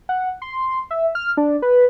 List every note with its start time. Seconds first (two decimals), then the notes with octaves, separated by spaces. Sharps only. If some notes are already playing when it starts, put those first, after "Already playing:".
0.09 F#5
0.42 C6
0.91 E5
1.15 F6
1.37 D4
1.62 B4